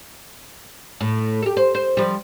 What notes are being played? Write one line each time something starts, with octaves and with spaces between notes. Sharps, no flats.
A2
G4 A4
C5
C5
F3 G3